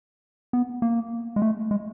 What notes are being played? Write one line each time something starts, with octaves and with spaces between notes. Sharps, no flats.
B3
A#3
G#3
A3
G#3